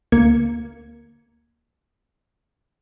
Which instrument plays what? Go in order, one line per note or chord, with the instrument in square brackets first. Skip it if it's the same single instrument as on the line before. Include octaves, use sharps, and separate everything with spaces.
[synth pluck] D2 A#3 G#6 C#7